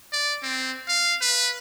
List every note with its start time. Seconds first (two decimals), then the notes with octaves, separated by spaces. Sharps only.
0.12 D5
0.43 C4
0.88 F5
1.21 B4